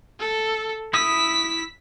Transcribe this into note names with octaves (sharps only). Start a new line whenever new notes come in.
A4
E4 D#6 E6 B6